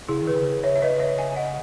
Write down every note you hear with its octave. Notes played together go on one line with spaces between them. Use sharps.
C#3 E4 G#4
D#3
G#4 B4
C#3
C#5 E5
E5
B4 D#5
C#5 E5
E5 G#5
D#5 F#5